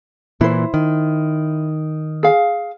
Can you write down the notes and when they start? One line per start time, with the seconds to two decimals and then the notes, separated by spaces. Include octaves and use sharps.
0.41 A#2 E3 E4 C5
0.74 D#3
2.23 G#4 F5